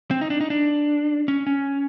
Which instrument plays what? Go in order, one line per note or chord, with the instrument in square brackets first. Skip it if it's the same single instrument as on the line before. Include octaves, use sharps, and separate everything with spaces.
[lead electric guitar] C4
D#4
D4
D#4
D4
C#4
C#4